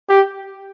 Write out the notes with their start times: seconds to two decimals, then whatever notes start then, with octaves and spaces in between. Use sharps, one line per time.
0.09 G4